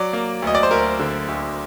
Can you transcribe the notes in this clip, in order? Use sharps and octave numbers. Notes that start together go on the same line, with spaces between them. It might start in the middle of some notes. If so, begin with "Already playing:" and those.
Already playing: F#3 D5
A#3
D2 D#5
D5
C5
D2 A#4
D3
D2